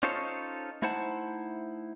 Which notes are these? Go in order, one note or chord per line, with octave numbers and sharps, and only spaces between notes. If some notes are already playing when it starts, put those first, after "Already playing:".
C#4 D#4 F4 A4 C5 C#5
A3 D#4 E4 C5 F#5 A5